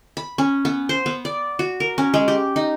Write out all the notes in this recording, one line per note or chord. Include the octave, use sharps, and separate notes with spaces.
B5
C#4
B3
C5
B3
D5
F#4
A#4
C#4
G#3
G4
D#4